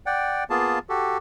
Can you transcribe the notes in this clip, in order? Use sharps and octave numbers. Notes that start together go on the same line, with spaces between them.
D5 F#5 G5
A#3 B3 F4 G#4 A5
F#4 G4 A4